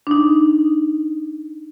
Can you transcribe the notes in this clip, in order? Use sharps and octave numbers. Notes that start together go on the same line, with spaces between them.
D4 D#4